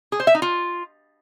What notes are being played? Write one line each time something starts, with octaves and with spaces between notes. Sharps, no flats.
G#4
C5
E5
D#4
F4